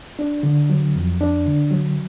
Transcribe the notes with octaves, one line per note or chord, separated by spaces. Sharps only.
D4
D3
F#3
F2
D4
D3
F#3